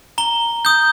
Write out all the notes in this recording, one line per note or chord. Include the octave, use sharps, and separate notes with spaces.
A#5 G7
D#6 G6